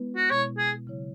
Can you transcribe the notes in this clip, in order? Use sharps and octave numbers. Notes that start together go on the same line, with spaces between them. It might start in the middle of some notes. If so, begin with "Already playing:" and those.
Already playing: G#3 B3 E4 B4
F#4
B2 G#3 E4 C#5
G#4
C#3 F#3 E4 C#5